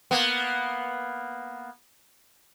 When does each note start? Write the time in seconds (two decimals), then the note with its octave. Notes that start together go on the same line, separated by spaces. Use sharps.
0.11 A#3 B3